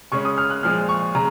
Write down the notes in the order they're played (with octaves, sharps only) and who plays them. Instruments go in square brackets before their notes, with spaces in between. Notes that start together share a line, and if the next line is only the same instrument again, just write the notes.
[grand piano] C#3 G#3 C#4 C#6
D#6
F6
F#6
A#2 F3 G#3 F6
C#6
C#3 A#5